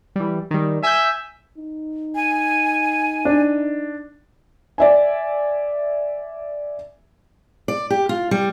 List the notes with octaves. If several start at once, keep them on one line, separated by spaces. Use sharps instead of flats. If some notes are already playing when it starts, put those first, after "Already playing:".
E3 G3
D#3 G3
E5 G#5 E6 G6
D#4
G#5
D4
D5 E5 G#5
D5
G4
F4
G3